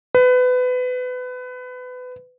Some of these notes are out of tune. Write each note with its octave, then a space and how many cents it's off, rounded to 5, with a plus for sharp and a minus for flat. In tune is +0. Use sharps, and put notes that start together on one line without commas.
B4 +25